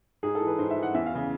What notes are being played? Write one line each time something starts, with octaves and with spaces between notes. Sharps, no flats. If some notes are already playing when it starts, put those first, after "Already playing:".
G#2 G#4
A4
E3
B4
G#2 C5
E5
E3
F#5
E2 E5
F5
C#3 E3